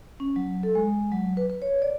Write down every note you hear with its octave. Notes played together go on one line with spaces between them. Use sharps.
C#4
F#3
A4
G#3
F#3
B4
B4
C#5
D5